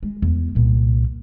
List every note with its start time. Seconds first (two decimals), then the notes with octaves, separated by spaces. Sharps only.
0.03 G#3
0.22 E2
0.55 C2 A#2